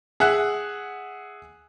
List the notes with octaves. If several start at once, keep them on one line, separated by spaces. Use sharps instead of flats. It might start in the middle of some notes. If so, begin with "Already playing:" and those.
G#4 E5 F#5 F#6